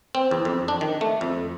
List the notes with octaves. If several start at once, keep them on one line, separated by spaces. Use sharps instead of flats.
C4
E2
F2
D4
D#3
A3
F2